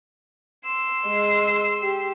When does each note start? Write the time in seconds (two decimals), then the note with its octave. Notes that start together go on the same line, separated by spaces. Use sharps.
0.65 C6 E6
1.06 G#3
1.82 G4